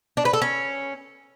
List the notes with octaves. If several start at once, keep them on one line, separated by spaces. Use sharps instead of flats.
D4
B4
A4
C#4